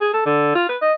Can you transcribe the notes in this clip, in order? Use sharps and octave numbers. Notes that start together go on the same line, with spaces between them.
G#4
A4
D3
F4
B4
D#5